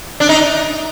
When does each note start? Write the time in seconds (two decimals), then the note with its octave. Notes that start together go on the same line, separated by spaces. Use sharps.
0.20 D4
0.29 D#4